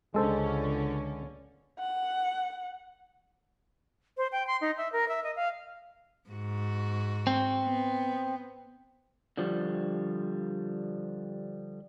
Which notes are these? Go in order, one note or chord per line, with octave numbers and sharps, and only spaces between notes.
C#2 D3 G#3 C#4 A4 C5
F#5
C5
G5
C6
D#4
E5
A#4
E5
D#5
F5
G#2 F#4
C4
B3
D3 F3 G3